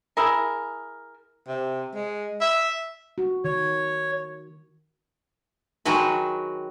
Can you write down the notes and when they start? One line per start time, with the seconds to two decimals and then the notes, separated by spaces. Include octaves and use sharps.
0.17 E4 G#4 A#4
1.48 C3
1.94 G#3
2.41 E5
3.18 F#4
3.44 D#3 C#5
5.85 D#3 F#3 G#3 F#4 B4